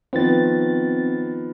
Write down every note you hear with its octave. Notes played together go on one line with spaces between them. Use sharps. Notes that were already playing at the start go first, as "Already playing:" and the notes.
D#3 F3 B3 C4 A6